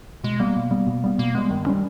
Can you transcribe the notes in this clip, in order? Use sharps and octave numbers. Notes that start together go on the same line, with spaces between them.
B2 G#3
G3 A#3 B3
B2
G3 B3
B2
G3 B3
B2 A#3
G3 G#3 B3
G2 D#3
G3 A#3 C#4